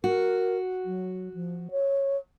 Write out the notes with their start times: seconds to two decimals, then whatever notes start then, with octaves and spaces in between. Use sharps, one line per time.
0.04 F#4 A#4
0.85 F#3
1.34 F3
1.71 C#5